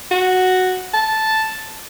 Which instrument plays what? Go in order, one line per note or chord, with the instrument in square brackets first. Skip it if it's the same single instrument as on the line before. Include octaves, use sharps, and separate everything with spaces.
[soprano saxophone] F#4
A5